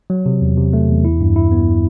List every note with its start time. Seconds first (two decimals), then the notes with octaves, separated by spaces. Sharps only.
0.10 F#3
0.26 C3
0.42 E2
0.57 C3
0.73 A3
0.89 E2
1.05 E4
1.21 G2
1.36 E4
1.52 B3